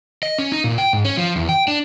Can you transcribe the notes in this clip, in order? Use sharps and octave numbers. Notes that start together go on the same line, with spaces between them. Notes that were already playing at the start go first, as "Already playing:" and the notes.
D#5
C#4
D#4
A#2
G5
G#2
C#4
F3
E2
G5
D4